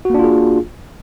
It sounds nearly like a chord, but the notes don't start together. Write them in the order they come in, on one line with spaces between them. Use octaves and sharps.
F#4 A#3 D4 F4 G#4